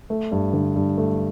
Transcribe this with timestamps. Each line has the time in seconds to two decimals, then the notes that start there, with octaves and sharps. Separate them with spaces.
0.10 A3
0.32 G2
0.53 D3
0.76 G2
0.98 A3